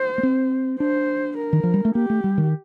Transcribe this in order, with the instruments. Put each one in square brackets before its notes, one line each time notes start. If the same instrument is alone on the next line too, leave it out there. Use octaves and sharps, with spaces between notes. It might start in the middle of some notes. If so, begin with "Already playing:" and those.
Already playing: [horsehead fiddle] C5
[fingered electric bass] A#3
C4
[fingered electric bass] D4 [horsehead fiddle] C5
[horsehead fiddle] A#4
[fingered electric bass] D#3
F3
G3
A3
[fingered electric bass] A#3 [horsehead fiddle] G4
[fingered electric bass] A3
G3
D#3